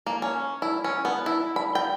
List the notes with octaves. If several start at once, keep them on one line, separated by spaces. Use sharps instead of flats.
A#3
C#4
E4
C#4
B3
E4
B5
G5